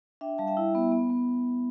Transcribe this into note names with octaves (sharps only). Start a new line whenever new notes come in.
D4 E5 G5
G3 F5 A5
E5 G5
E4
B3
B3
B3